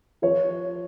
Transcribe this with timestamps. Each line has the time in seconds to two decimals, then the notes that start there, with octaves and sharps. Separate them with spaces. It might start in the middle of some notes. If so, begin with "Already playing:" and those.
0.22 F3 C#5